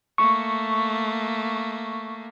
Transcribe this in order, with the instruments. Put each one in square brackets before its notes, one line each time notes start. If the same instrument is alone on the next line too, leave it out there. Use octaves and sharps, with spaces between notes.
[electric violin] A3 A#3 [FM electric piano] C#6